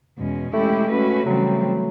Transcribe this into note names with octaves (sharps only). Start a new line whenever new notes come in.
E2 B2 G#3 C#4
G#3 A3 C#4 E4 G4
G#3 C#4 F#4 B4
C#3 E3 F#3 G3 C4